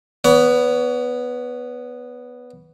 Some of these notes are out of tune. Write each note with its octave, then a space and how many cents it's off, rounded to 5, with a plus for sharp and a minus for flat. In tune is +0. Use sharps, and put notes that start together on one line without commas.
B3 +0 C#5 +35